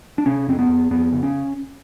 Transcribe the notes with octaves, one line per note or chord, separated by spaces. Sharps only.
D4
C3 C#4
F2 C4
B3
F2
F2 B3
C#3
C#4